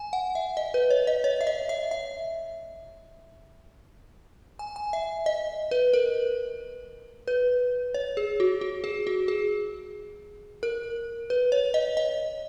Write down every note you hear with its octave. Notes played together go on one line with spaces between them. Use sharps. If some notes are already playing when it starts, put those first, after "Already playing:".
Already playing: G#5
F#5
E5
D#5
B4
C#5
D#5
C#5
E5
D#5
E5
E5
G#5
G#5
E5
D#5
B4
A#4
B4
C#5
G#4
F#4
F#4
G#4
F#4
G#4
A#4
B4
C#5
D#5
D#5